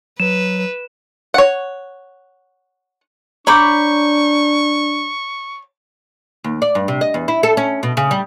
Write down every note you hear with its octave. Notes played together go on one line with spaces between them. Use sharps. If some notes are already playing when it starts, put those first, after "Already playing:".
F#3 B4 E7
C#5 F#5
D4 C#5 A#5 B5 C#6 D6 G6
D#2
D5
G2
C3
D#5
E2
E4
A4
C#4
B2
C#3
G3